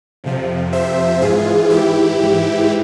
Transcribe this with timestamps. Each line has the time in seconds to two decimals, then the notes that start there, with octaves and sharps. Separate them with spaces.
0.24 F2 C3 F3
0.73 C5 E5
1.22 G#2 E3 F4 G#4
1.70 E4 G4
2.20 G#2 E3